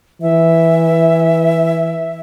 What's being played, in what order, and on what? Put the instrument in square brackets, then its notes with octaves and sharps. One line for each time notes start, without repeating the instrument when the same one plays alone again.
[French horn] E3 [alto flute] E5